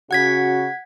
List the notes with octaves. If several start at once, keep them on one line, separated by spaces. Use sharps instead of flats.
C#3 F#4 F#5 G#6 B6